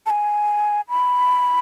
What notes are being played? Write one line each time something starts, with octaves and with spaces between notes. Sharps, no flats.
A5
G#5
B5